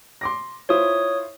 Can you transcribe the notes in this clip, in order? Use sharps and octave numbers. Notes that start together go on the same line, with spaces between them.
C6 D6 A#6
E4 F4 C5 C#5 D#6